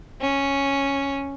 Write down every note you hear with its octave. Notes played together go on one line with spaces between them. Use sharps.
C#4